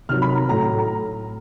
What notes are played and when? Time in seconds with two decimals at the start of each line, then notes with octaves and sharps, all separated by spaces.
0.09 C3 D#3 F#3 F6
0.22 B5
0.35 A#5
0.48 A2 F#3 A#5
0.79 A#5